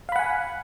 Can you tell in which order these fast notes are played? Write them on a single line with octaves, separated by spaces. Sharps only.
F5 B5 F#5 G#5